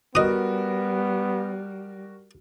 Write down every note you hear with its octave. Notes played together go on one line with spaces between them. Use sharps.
G3 B3 F#4 A#4 D#5 D#6